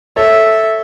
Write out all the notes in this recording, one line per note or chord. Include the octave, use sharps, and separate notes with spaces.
A4 C#5 E5